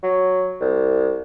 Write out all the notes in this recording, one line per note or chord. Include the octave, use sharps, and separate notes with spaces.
F#3
C2